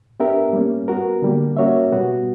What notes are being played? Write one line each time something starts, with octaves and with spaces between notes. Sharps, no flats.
B3 D4 G4 A#4 E5
G3 A#3 C#4
B3 F#4 A#4
D3 G3 A#3
A#3 C#4 F#4 C#5 E5
B2 G3 B3 F#4